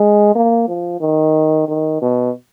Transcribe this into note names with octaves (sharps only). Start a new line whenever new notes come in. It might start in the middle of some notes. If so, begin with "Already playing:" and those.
Already playing: G#3
A#3
F3
D#3
D#3
B2